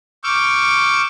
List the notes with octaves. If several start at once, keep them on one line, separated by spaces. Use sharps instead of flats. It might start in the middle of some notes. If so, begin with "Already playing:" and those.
C#6 D6 E6 F6 G6